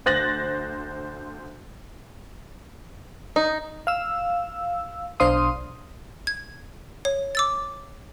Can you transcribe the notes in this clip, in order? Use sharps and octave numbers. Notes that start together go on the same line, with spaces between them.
D2 C5 F#6 A6 A#6 F#7
D#4
F5 E6
B1 D4 C5 F5 C6 D#6
G#6
C#5
D6 E6 A6